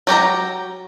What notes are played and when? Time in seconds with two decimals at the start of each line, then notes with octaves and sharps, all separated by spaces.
0.07 F#3 G4 A4 A#5